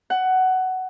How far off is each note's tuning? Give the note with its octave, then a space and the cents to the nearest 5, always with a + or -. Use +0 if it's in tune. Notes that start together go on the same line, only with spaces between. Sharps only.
F#5 +15